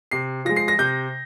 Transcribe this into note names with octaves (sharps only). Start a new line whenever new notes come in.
C3 C7
F3 G#3 A#6
C7
A#6
C3 G6